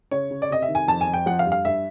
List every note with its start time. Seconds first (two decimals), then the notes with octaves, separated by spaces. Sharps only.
0.11 C#3 C#5
0.31 C#3
0.42 D5
0.50 C3 D#5
0.62 E5
0.69 D#3
0.75 G#5
0.88 F2 A5
1.01 G#5
1.07 F2
1.14 G5
1.26 F3 F#5
1.39 F5
1.46 G2
1.52 F5
1.65 G2 E5